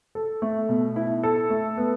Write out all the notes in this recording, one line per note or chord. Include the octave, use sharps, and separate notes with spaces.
A4
A3
B2
E4
A4
A3
B3